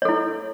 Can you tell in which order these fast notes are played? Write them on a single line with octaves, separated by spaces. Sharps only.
C#5 A4 E4